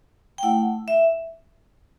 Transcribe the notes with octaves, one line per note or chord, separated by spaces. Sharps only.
G5
A3 E4 F#5
E5